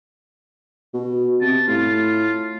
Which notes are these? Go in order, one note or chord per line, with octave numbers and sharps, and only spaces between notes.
B2
C3 A5
A2 F4